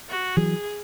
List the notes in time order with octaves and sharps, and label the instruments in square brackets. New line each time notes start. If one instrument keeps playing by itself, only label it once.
[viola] F#4
[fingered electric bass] E3 F#3 [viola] G#4